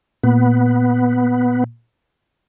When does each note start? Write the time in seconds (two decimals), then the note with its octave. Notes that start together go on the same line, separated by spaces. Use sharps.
0.24 A#2 B3